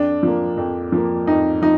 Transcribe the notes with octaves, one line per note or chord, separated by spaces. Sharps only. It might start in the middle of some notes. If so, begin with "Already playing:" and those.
Already playing: F2 D4
F3 A#3
F2
F3 A#3
F2 D#4
F3 D#4